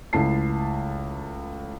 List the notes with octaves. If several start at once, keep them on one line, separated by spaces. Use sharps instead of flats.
C#2 A3 E4 A5 C7